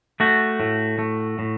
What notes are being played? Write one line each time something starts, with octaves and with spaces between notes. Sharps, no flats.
A3 F#4
A2
A3
A2